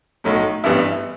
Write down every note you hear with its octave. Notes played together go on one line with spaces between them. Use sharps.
B1 A2 F#3 A3
A1 G2 E3 G3 B3 E5